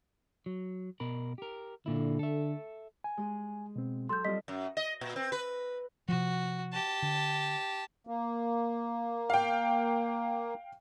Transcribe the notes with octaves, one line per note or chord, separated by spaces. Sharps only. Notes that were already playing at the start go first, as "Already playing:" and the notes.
F#3
B2 A#4 B5
G4 A#4
A#2 D3 E4
A4 E5
G#5
G#3 G#4
B2 C4
F#3 A4 C6 G6
G3 C4 F4 D#5 B6
F#2
D#5
A#2
C4
B4
C3 F3 F#4
G4 A5
D3
A#3
F5 G5